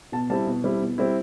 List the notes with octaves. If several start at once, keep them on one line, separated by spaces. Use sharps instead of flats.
B2 A5
G3 C4 E4 A5
B2
G3 C4 E4
B2
G3 C4 E4